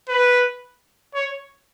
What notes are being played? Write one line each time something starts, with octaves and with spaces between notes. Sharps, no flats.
B4
C#5